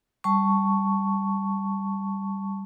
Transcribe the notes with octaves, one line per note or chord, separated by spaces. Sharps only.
G3 A5 C#6